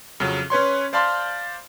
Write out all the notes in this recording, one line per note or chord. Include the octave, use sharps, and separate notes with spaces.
F2 C#3 F#3
C#4 B4 C#5 C6
C5 D5 F5 A5 B5 C6